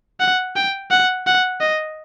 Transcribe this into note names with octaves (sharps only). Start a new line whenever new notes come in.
F#5
G5
F#5
F#5
D#5